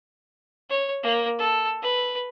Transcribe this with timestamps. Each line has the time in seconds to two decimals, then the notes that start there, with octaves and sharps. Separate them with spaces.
0.70 C#5
1.03 A#3
1.39 A4
1.83 B4